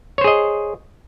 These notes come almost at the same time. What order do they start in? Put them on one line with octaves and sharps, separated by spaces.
C#5 C5 G#4 D#5